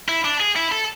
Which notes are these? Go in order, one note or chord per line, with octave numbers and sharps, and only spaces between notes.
E4
D4
G#4
E4
A4